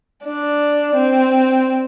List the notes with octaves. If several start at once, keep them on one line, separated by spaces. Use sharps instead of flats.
D4
C4